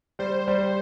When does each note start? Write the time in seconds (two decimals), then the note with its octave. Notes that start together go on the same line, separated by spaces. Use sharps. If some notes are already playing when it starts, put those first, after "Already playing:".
0.19 G3 C5
0.48 G3